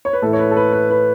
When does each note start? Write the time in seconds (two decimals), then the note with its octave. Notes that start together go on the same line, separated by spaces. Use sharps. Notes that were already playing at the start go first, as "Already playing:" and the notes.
0.05 C#5
0.13 B4
0.22 A2 E3 A4
0.33 C#5
0.39 B4
0.51 A4
0.57 B4
0.73 B4
0.90 B4